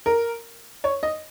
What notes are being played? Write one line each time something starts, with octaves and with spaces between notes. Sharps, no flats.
A#4
C#5
D#5